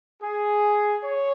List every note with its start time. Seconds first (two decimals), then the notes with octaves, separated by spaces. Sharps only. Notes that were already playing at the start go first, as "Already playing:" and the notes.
0.22 G#4
1.03 C#5